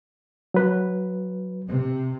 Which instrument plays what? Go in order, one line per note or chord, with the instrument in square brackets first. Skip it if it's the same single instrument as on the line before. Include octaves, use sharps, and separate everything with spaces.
[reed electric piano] F#3 B4
[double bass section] C3